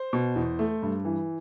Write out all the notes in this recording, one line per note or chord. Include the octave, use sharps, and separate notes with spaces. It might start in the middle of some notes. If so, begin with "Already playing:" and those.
Already playing: C5
B2
E2
A3
G2
E3